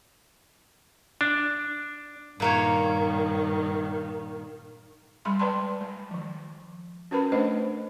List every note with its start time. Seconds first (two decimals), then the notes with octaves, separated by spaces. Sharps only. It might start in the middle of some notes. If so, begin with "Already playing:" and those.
1.21 D4
2.40 G2 A#2 D#3 A#3 C#5
5.25 G3 G#3 B5 C6
5.39 B4 D5 G5 A5 B5 C6
5.81 G#3
6.11 D#3 F3
7.11 C#4 F#4 A#4 B4 A5 B5
7.32 A3 D4 B4 C5 D#5